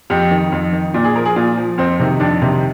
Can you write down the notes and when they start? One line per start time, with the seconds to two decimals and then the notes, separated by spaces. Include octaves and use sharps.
0.10 F2 G4
0.31 D#3
0.52 F2
0.73 D#3
0.94 A#2
1.04 G#4
1.15 F3 A#4
1.25 G#4
1.36 A#2 F4
1.57 F3
1.78 F2 C4
1.99 C3 D#3
2.20 F2 D4
2.42 C3 D#3